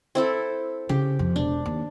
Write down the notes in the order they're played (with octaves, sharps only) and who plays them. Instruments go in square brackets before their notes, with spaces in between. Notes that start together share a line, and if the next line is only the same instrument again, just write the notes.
[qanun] C4 E4 A4
[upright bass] C#3 [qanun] G4
[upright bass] F2
[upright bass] E1 [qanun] D4
[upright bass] D#2